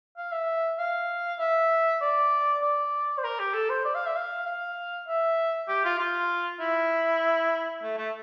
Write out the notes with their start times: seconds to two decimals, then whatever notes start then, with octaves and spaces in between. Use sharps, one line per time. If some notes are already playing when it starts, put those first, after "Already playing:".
0.17 F5
0.32 E5
0.78 F5
1.39 E5
2.01 D5
2.62 D5
3.18 C5
3.24 A#4
3.39 G4
3.54 A4
3.70 C5
3.85 D5
3.95 F5
4.06 E5
4.16 F5
4.46 F5
5.08 E5
5.68 G4
5.84 F4
5.99 F4
6.60 E4
7.83 A3
7.98 A3